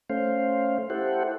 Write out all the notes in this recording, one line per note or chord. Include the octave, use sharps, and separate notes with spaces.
A3 C#4 C5 F5
E4 G4 A4 C5 F#5